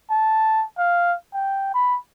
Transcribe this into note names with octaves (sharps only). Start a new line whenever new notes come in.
A5
F5
G5
B5